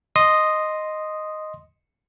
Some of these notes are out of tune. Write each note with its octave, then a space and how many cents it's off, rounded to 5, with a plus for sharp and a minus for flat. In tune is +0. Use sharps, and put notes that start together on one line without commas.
D#5 +0 C6 +0 D#6 -5